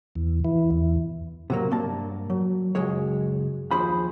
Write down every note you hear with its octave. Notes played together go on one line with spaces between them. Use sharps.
E2
E3
E2
C3 F#3 A#3
G2 A#3 A5
F#3
C#2 F#2 G#3 C#5
D#2 F3 G#4 C5 B5